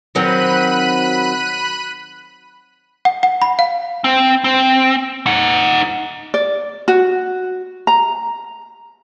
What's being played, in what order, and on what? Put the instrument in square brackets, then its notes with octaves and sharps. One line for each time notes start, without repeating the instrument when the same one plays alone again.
[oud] D#3 F#3 C4 [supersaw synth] B5 F#6 D#7
[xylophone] F#5
F#5
B5
F5
[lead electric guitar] C4
C4
D#4 F#5
[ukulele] D5
F#4
A#5